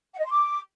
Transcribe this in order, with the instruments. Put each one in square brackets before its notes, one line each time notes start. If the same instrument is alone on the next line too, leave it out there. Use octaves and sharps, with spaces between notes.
[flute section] F#5
D#5
C6
D6